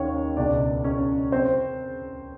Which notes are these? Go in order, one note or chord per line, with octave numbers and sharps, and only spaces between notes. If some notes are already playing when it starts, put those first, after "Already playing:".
Already playing: D#2 D#3 C#4 C#5
C#2 B2 D4 D5
C#4 C#5
C4 C5